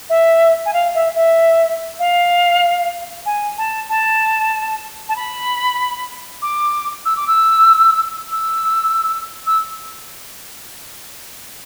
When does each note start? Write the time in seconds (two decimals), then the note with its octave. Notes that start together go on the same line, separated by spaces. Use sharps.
0.09 E5
0.65 G#5
0.73 F5
0.94 E5
1.15 E5
1.99 F5
3.25 G#5
3.58 A5
3.89 A5
5.09 A5
5.16 B5
6.42 D6
7.05 E6
7.16 D6
7.27 E6
8.31 E6
9.46 E6